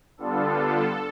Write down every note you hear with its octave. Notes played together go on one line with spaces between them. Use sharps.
D3 G3 B3 D4 F4 A4